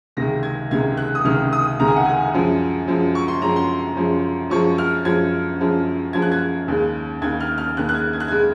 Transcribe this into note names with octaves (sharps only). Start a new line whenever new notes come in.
C#2 C3 D#3 G#3 A#6
G#6
C#2 C3 D#3 G#3 G#6
F#6
D#6
C#2 C3 D#3 G#3 F6
D#6
C#2 C3 D#3 G#3 A#5
G#5
F#5
G#5
F#2 F3 G#3
F#2 F3 G#3
C#6
C6
F#2 F3 G#3 A#5
C6
F#2 F3 G#3
F#2 F3 G#3 C#6
F6
F#2 F3 G#3 G#6
F#2 F3 G#3
F#2 F3 G#3 G#6
F#6
G#6
D#2 C#3 G#3
D#2 C#3 G#3 G#6
F6
F6
D#2 C#3 G#3 F#6
F#6
G#6
G#6
F#6
C#3 G#3 G#6